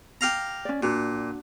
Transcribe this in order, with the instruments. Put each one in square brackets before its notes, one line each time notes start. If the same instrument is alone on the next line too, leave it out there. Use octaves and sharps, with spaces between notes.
[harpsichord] G4 F5 A#5
[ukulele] C#4 D5
[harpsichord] A#2 [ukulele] D4 F#4